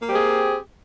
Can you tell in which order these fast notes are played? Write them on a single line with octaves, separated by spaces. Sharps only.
A#3 G4 C4 G#4